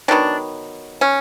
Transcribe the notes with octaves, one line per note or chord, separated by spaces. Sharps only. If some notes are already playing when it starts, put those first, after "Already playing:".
D#3 F#3 B3 D4
C#4